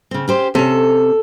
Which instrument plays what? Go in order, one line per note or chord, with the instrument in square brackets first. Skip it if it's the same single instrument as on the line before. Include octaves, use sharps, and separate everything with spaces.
[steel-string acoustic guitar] C#3 C4
C#4 G4 C5
[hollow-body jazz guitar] C3 C#4 [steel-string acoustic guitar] A4